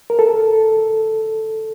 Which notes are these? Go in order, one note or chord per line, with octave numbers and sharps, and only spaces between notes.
A#4
A4